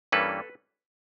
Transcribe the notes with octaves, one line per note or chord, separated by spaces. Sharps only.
G2 E3 G3 A#3 C#4 A4 B4